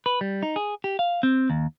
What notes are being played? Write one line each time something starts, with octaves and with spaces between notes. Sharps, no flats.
B4
G3
D#4
G#4
G4
F5
C4
D#2